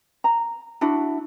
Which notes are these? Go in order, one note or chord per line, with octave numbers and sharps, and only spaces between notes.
A#5
D4 E4 F#4